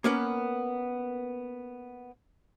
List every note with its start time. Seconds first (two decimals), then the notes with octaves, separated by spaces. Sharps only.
0.04 A#3 B3 C#4 A#4 B4